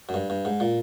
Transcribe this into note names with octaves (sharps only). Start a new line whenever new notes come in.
F#2
G2
G2
G#2
A#2